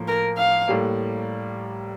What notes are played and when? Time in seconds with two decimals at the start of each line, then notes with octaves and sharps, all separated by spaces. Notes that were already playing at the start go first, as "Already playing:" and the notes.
Already playing: A2 F3 A#3
0.08 A#4
0.38 F5
0.68 A2 G3 A#3